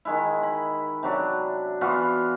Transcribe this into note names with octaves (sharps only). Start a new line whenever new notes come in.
D#3 G#3 E4
B5
C3 F#3 D4
E3 B3 F4 F#4